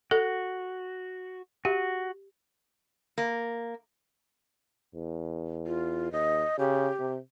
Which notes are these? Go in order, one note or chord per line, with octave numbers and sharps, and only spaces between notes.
F#4 A4
F#4 G4
A#3
E2
F4
D#2 D#5
C#3 G4
C3